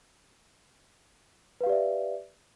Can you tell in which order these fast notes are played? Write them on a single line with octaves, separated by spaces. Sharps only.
B4 F5 G4 D5 E5